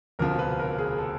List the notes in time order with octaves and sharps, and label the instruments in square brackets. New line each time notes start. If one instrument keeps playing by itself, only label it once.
[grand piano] E1 D2 C3 F3 A#4
B4
A#4
G#4
A4